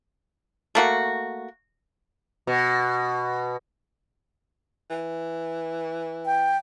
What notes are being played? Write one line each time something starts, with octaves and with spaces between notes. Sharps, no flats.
A3 A#3 F#4
B2
E3
G5